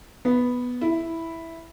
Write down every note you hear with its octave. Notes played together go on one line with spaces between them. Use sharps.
B3
E4